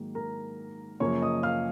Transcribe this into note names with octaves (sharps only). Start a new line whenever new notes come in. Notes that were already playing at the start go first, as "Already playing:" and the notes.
Already playing: G#2 D#3 F#3 A#3
A#4 A#5
F#2 C#3 F3 A#3 C#5 C#6
D#5 D#6
F5 F6